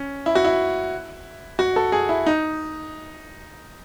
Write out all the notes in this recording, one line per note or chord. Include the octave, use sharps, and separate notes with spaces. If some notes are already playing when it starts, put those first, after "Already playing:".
Already playing: C#4
E4
F#4
E4
F#4
A4
G#4
E4
D#4